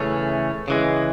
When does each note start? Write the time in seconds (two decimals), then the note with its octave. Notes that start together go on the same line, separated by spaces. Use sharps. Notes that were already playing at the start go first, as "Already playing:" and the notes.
Already playing: C#3 E3 A3 C#4
0.68 C#3 E3 G#3